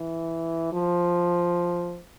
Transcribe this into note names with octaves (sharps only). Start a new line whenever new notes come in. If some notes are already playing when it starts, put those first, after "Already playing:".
Already playing: E3
F3